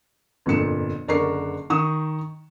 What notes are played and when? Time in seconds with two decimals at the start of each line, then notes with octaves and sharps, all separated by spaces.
0.46 G1 F2 A#2 C#7 E7
1.08 F#1 D3 D4 A#4 C#6 C7
1.70 D#3 D#4 C#6 D#6 E7